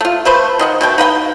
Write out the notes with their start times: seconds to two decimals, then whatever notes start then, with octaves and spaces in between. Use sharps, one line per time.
0.01 A3 F4
0.25 A3 B4 C5
0.59 D#3 D#5 F#5
0.81 B2 A3 G5
0.98 D#4 B4 F#5 G5